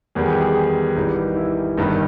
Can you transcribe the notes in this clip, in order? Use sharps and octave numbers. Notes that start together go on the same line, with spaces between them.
E2 D#3 G3 G#4
G4
G#4
G#1 G#2 E3 G3 D#4
E4
G1 G2 D#3 G3 D#4